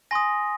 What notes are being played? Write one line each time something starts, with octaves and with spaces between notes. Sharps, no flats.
G#5 C6 D#6 A#6